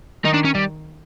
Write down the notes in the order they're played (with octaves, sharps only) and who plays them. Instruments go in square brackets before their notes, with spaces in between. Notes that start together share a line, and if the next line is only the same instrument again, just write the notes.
[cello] D#3 [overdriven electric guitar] D#4
[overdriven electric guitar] D4
C#4
G3